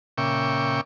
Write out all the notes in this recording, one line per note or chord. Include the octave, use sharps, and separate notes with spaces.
A#2 C#3 E5 G5 C#6 D6